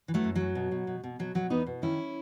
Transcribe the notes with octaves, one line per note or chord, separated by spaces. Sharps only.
E3
F#3 A3
F#2
F#2 F#3
B2
B2
B2
B2
B2 F#3
B2 F#3
E2 B3 D#4
B2
D#3 C#4 E4